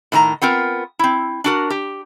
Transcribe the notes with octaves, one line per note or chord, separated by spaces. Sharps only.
A2 D#3 D4 A#5
B3 C4 F4 A#4
C4 E4
D4 F#4 A#4
G4